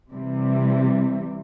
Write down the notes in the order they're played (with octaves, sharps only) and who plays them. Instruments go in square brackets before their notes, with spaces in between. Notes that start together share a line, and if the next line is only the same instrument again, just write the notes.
[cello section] C3 E3 G3